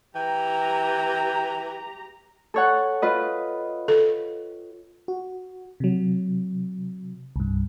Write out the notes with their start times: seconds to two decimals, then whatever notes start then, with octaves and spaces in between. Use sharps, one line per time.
0.15 E3 G4 G5 A#5
2.54 A4 C#5 F#5
3.02 F4 B4 D#5
3.88 A4
5.08 F#4
5.80 C3 F#3
7.36 C2 G2